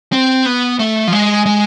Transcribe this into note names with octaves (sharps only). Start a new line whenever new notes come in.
C4
B3
A3
F3
G#3
G#3